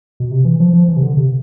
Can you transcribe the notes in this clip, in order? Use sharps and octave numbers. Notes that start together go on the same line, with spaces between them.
B2
C3
E3
F3
F3
E3
C3
D3
C3